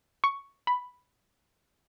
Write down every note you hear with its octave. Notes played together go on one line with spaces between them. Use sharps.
C#6
B5